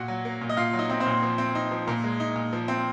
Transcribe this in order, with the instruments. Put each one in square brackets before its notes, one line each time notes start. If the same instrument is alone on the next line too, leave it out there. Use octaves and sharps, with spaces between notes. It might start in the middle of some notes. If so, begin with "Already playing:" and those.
Already playing: [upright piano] A#2 F#4 F#5
F#3
A#3
A#2
D#5
A#2 F4 F5
F#3
D#4 D#5
C4
C4 C5
A#2
F3
C4
D#4
F3
A#2 A#3 A#4
G#3
D#4
A#2
F3
C4